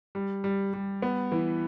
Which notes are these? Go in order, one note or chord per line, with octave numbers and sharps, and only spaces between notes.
G3
G3
G3
B3
E3